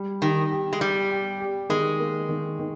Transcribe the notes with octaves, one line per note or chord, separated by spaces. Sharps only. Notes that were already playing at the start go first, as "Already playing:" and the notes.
Already playing: G3
D#3 G4
G4
G#3
G3 G4
G4
G4
D#3 G#3
A#3
D#3
D#3